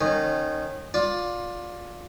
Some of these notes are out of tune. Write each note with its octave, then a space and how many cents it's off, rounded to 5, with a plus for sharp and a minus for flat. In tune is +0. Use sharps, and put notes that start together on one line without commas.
D#3 -20 C#4 -35
F4 +20 D5 +0